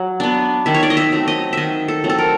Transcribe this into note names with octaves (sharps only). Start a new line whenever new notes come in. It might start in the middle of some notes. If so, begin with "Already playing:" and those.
Already playing: F#3
B3 D4
D#3 E5
C#5
D5
D#5
E5
F#3 A3 C4
D#5
D#3 D#5 E5
A4
F#3 A3 C4
A4
A#4